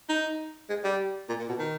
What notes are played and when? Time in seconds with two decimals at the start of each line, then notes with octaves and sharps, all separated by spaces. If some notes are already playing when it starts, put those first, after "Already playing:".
0.09 D#4
0.69 G#3
0.84 G3
1.29 A#2
1.39 A#2
1.49 B2
1.59 D#3